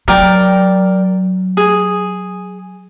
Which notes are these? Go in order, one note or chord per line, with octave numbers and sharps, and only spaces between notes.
F#3 A#4 D5 G5
G#4